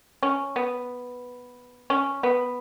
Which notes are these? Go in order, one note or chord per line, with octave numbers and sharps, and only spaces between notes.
C#4
B3
C#4
B3